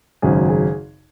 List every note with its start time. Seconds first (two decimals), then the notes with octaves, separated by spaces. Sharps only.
0.22 G#1 F#2 C#3 G#4
0.49 G#4